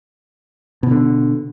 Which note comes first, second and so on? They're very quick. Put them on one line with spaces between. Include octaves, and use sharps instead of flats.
B2 D#3 D3